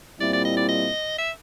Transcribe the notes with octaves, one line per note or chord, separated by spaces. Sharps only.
A#2 G3 C4 E4 D5
D5
D#5
D5
D#5
E5